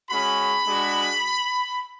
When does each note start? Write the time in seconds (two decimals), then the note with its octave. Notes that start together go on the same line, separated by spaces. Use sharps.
0.10 G#3 C#4 F#4 B5
0.66 G#3 D4 F#4